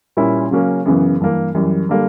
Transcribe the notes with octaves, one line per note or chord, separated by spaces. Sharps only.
A#2 G3 C#4 E4
C#3 F#3 A#3 C#4
F#2 C#3 E3 B3
G2 E3 A#3
F#2 E3 G3
D3 G3 A#3